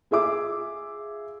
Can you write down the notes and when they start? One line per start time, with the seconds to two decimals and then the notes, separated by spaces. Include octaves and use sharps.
0.11 F4 G#4 E5 D6 E6